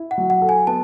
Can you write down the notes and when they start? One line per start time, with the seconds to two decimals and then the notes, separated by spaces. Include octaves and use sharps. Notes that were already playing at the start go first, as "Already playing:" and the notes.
Already playing: E4
0.11 F#5
0.18 F#3
0.30 F#5
0.42 A4
0.49 G#5
0.67 B3 A5